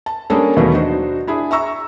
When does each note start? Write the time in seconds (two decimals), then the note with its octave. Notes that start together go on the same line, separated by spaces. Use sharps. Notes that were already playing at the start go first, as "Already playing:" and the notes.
0.06 A5
0.30 G3 A#3 C#4 D4 G#4 A4
0.56 D#2 B2 E3 F#3 A3 B3
0.73 D4 D#4 F#4 C5
1.27 D4 E4 G#4
1.51 E5 A#5 C#6 E6